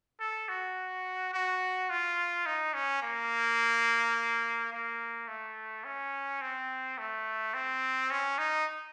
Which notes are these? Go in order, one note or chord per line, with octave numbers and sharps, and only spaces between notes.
A4
F#4
F#4
F4
D#4
C#4
A#3
A#3
A3
C#4
C4
A3
C4
C#4
D#4